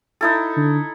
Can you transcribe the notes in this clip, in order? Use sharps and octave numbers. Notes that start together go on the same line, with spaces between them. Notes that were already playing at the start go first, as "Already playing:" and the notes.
D#4 E4 A4
D3